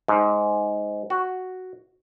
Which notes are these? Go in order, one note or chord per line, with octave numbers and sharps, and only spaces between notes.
G#2
F#4